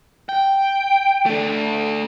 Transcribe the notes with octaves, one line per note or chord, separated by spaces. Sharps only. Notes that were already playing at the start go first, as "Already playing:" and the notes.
G5
A3 D4